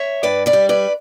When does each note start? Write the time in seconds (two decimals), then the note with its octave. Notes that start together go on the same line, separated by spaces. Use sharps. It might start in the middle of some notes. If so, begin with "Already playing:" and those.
Already playing: C#5 E5
0.23 G2 B4 D5
0.46 B4 D5
0.53 G3
0.69 B4 D5